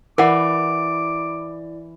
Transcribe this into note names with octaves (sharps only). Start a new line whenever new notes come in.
E3 E4 A#4 D5 F#5 D6